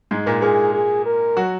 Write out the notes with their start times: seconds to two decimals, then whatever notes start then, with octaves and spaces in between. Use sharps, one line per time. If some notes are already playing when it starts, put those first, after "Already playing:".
0.11 G#2 G#3
0.26 A#2 A#3
0.42 A#2 A#3 G#4
0.74 G#4
1.06 A#4
1.36 F#3 F#4